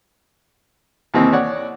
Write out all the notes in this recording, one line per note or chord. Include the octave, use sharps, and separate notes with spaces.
D#2 C3 E3 C4 D#4
C#5 D5 F#5